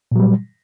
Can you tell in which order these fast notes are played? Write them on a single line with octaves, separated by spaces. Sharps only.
A#2 F#3 G3